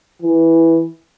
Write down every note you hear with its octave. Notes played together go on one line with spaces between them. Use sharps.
E3